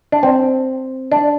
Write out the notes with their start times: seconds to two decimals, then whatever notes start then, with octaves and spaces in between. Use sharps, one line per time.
0.12 D4
0.23 C4
1.12 D4